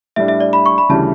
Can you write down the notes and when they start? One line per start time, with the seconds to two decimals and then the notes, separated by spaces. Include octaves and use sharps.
0.16 A2 G3 D4 E5
0.28 E5
0.40 D5
0.53 B5
0.66 C#6
0.78 B5
0.89 D2 C#3 E3 G3 A5